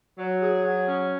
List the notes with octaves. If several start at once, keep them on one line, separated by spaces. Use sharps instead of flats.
F#3
G#4
F#3
C#4